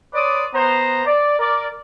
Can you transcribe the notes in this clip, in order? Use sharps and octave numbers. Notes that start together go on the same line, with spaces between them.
B4 C#5 D5 C6 D6 D#6
B3 C5 A#5
D5
A#4 D5